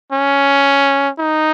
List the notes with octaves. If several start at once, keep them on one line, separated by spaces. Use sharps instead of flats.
C#4
D#4